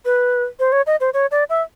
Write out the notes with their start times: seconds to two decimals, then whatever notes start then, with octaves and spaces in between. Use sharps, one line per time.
0.05 B4
0.60 C5
0.72 C#5
0.87 D#5
1.01 C5
1.14 C#5
1.31 D5
1.50 E5